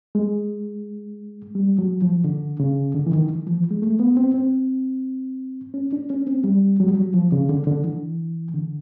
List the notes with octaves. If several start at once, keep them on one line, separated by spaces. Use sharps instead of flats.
G#3
G3
F#3
F3
D3
C#3
D3
E3
D#3
E3
F3
G#3
A3
B3
C4
C4
C#4
D4
C#4
C4
G3
F#3
G3
F#3
F3
C#3
D3
D3
E3
D3